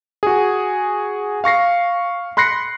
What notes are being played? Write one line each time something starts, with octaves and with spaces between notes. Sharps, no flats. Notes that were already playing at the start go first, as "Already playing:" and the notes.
F#4 G#4
F5 C#6 A#6 C7
B5 C6 F#6 A#6 C7 C#7